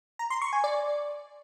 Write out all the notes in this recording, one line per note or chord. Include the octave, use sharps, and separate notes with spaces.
A#5
C6
C#6
G#5
D5